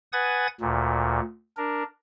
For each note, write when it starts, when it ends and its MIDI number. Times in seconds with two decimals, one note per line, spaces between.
0.13 0.47 71
0.13 0.47 78
0.13 0.47 80
0.13 0.47 87
0.13 0.47 92
0.13 0.47 93
0.60 1.20 38
0.60 1.20 46
1.57 1.84 62
1.57 1.84 70